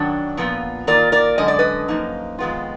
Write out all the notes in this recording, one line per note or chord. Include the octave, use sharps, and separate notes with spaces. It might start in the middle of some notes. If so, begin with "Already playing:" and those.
Already playing: F#2 D#3 F#3 D4
A#2 F3 B3 F4
D#3 A#3 F4 A#4 D5
A#4 D5
F#2 D3 G#3 D#5
D5
B4 D#5
F#2 F3 A#3 D#4
F2 D#3 G#3 B3 F4